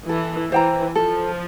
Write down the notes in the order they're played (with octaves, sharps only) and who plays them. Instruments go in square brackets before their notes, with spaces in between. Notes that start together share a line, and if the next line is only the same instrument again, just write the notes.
[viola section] E3 [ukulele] A4
[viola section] E3 [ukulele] C5 G5 A#5
[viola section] F3 [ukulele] A4